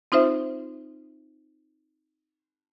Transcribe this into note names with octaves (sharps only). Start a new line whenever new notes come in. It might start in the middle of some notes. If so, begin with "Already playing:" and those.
C4 D#4 F4 C5 E5